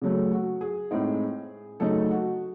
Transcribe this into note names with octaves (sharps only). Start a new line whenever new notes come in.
C#3 F#3 A3
F#4
G#4
A2 G#3 C4 D#4
C#3 F#3 A3 D#4 A4
F#4